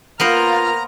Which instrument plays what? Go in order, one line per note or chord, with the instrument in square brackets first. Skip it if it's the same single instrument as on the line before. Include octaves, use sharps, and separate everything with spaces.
[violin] A#3 F6 [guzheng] B3 A#4 C5 [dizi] F4 [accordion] A#5